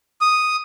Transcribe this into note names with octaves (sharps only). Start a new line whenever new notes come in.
D#6